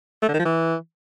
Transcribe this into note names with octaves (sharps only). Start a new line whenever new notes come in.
A3
D3
D#3
F3
E3